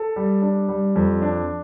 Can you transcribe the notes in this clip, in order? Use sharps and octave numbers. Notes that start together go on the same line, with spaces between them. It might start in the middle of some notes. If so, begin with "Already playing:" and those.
Already playing: A4
G3
D4
G3
F2
D4